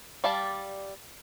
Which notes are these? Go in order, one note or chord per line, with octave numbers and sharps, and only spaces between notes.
G3 D5 F5 G5 A5